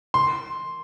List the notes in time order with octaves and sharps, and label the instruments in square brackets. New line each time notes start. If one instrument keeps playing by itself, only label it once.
[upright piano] C6